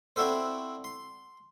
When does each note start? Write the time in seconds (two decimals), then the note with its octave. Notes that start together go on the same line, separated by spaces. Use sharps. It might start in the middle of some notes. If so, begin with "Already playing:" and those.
0.16 C4 D4 E4 F#4 A4 C5
0.84 C6